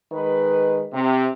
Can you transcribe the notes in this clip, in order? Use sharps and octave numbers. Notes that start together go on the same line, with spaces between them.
D#3 G#3 B4
C3